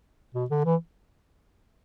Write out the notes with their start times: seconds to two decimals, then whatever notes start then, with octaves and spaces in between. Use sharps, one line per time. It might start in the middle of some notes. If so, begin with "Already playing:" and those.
0.34 B2
0.50 D3
0.65 E3